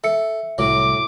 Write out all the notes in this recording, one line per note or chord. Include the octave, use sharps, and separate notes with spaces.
A4 E5 C#7
C2 A2 F#3 D6